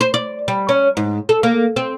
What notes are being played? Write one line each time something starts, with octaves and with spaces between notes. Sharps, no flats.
C5
D5
G3
C#4
G#2
A4
A#3
C4